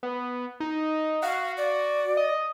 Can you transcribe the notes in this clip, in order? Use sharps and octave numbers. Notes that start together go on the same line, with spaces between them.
B3
D#4
F#4 F5
D5
D#5